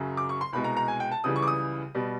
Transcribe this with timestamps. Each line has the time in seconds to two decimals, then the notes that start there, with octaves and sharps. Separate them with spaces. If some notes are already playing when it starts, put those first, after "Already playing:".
Already playing: F#2 C#3 F#3
0.17 D6
0.29 C#6
0.41 C6
0.53 C2 B2 G#3 B5
0.64 A#5
0.77 A#5
0.88 G#5
1.00 G5
1.12 A5
1.24 C#2 C#3 E3 G3 D#6
1.36 C#6
1.42 D6
1.47 D#6
1.94 B2 G3